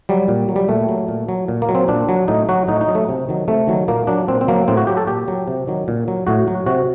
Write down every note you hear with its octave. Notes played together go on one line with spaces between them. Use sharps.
F#3 G3
A#2
F#3
G3
A#2 A3
F#3
A#2
F#3
A#2
A#3
F#3
C4
A#2 D4
F#3
A2 D#4
F#3 F#4
A2 D#4
D#4
F#3
A3
C3
D#3 F#3
C3 A3
D#3 F#3
A#2 A#3
F#3 D4
A#2 C4
C4
F#3 A#3
A2 C4
F#4
F#3 G4
A4
A#2 G4
F#3
C3
D#3 F#3
A#2
F#3
A2 F#4
F#3
C3 F#4